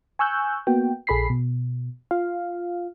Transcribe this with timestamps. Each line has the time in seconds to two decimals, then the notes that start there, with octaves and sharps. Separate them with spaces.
0.19 G#5 C#6 E6 F#6 G6
0.67 A#3 B3 F#4 G5
1.07 A#1 G#4 A4 B5 B6 C7
1.30 B2
2.11 F4 F5